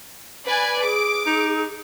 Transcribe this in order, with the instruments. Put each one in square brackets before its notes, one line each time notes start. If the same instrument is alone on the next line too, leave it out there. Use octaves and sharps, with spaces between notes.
[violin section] B4 D5 G#5
[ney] G#4 [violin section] D6
[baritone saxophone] D#4